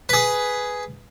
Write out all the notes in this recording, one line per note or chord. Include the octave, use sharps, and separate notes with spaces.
G#4 B4